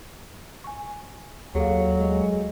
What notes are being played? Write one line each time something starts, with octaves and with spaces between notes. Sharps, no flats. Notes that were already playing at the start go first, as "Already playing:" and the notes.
G#5 C#6
D#2 F#3 G#4 A4 F5
G#3